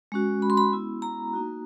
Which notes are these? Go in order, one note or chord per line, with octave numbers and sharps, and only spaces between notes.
G#3 C#4 F#4
B5
C6
B5
B3 E4
A#5
A#3 D#4 F#4